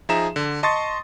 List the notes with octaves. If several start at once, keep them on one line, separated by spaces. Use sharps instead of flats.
F3 D#4 G#4 E5 A#5 E7
D3
D#5 A5 C6 C#6 D#6 A6